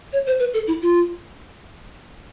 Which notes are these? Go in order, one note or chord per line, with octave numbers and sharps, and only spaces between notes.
C#5
C5
B4
A4
E4
F4